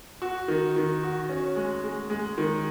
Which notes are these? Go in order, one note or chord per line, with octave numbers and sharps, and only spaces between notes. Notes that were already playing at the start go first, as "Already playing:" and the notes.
F#4
D#3
D#3
F#4
C#4
G#3
G#3
G#3
D#3